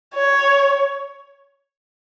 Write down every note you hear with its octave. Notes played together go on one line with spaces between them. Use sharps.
C#5